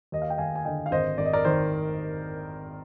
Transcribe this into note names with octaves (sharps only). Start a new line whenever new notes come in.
D#2 D#5
F5
G5
D#2 F5 G#5
G#5
D3 D#5 G5
F5
G#1 C5 D#5
G#1 D5
D#5
A#4 D5
D#3 C5